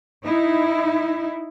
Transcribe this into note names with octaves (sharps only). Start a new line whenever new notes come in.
D#4 E4